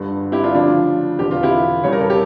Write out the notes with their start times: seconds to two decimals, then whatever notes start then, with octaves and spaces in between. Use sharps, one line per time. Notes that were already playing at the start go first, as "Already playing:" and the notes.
Already playing: G1 G2 D3 G3
0.32 E4 G4
0.43 D4 F4
0.54 D2 C#3 F3 D4 F4
1.19 E1 E2 D3 G4
1.31 F4
1.43 E4 G4
1.84 E1 E2 C#3 G3 C#5
1.92 A#4
2.01 A4
2.10 G4